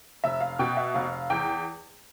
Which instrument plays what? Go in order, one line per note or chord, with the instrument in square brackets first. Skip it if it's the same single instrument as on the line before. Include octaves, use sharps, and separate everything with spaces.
[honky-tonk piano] F1 E5
F5
B2 G5
E5
F1 F5
E2 G5